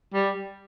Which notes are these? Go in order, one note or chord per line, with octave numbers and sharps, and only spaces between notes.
G3